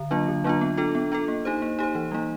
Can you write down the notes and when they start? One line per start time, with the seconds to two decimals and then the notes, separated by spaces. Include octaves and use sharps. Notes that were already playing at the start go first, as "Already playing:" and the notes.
Already playing: D3
0.11 F#3 A#3 D4 F4
0.28 D3
0.44 F#3 A#3 D4 F4
0.61 B3
0.77 D4 F4 A4
0.95 B3
1.12 D4 F4 A4
1.28 A#3
1.45 D#4 G4 C5
1.62 A#3
1.79 D#4 G4 C5
1.95 E3
2.11 G3 A#3 D#4